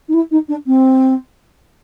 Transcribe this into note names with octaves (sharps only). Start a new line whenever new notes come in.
D#4
E4
D#4
D4
C4